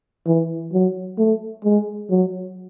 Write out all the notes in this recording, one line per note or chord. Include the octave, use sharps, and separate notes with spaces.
E3
F#3
A3
G#3
F#3